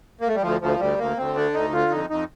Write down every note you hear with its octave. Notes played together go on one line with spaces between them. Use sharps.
A#3
A3
G3
D2 F3
D2 F3
D2 G3
D2 A#3
D2 C4
D3 D4
D2 D#4
D3 F4
F2 D#4
F2 D#4